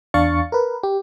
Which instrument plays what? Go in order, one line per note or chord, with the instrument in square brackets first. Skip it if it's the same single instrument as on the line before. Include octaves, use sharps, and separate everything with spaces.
[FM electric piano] E2 D4 F5 C#6 A6 C#7
A#4 B4
G4